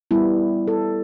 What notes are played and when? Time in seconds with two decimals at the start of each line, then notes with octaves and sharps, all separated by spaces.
0.11 G3 B3 E4
0.68 A4